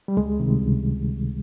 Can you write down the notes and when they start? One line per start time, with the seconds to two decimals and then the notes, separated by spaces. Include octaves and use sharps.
0.08 G3
0.17 C#2 G#3
0.40 C3 D#3 G3
0.62 C#2